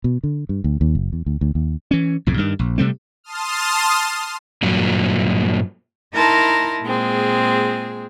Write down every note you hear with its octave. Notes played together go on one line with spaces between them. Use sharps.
B2
D3
G2
D2
D#2
F#1
E2
D2
D2
D#2
E3 C#4
B1 F2 A2
G2 D#3
A#1
C3 G3 A3 C4
A5 C6 D#6 F6
G2 A#2 F#3
D#4 E4 A#4 A5 A#5 C6
A#2 G#3 C4 G#4